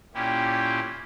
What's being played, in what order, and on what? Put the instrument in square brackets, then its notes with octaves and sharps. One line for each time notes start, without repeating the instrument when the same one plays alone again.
[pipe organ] A#2 C#4 E4 G4